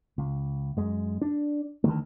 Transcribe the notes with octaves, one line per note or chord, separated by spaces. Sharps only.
C#2
F#2 G#3
D4
D2 D#3 A3